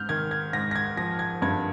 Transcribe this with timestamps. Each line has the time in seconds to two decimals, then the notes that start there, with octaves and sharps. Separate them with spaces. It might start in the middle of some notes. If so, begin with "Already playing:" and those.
Already playing: G#2 F6 G6
0.09 D#3 G#6
0.31 G#6
0.53 G#2 A#6
0.71 A#6
0.76 G#6
0.97 F3 A#6
1.19 G#6
1.42 G2 G#6